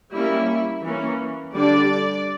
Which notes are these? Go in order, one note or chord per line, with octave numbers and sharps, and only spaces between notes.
G3 A#3 C#4 E4
E3 A#3 C#4
D3 G3 D4 D5